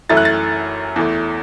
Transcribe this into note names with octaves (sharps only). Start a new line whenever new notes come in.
F#2 E3 A3 E4 A6
F#6
A6
E2 E3 A3